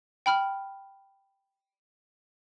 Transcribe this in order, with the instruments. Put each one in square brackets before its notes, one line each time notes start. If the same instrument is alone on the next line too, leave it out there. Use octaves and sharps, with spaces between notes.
[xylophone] G5 B5 F6